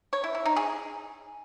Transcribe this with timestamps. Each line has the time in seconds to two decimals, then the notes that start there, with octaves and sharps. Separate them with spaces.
0.13 C#5
0.24 E4
0.35 E4
0.46 D#4
0.56 G#4